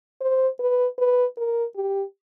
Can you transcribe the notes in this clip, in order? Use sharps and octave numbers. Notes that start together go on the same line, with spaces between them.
C5
B4
B4
A#4
G4